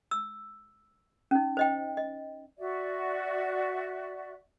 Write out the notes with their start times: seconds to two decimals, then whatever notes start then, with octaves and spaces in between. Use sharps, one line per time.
0.11 E6
1.31 C#4 D#4
1.57 C5 D#5 G5
1.97 D#5
2.58 F#4 D5 E5